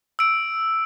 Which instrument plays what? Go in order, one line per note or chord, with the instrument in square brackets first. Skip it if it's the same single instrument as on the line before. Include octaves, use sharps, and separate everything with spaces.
[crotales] E6 D7